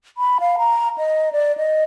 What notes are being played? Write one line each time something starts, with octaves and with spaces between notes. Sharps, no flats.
B5
F5
A#5
D#5
D5
D#5